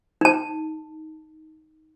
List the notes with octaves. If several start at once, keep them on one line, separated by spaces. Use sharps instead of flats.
D#4 A5